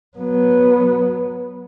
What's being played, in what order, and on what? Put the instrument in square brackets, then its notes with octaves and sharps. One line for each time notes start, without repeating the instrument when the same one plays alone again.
[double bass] F#3 B3